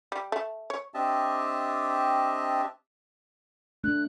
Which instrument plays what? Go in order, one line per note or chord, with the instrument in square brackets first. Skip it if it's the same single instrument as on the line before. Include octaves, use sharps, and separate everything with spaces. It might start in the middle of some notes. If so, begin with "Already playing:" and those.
[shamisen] G3
A3
C#5
[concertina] C4 D4 G4 D#5 E5 A5
[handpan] A3 D4 [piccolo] F#6